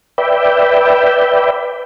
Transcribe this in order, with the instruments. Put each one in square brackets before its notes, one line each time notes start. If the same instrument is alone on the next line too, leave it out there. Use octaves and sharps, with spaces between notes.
[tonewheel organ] B4 D5 E5 G5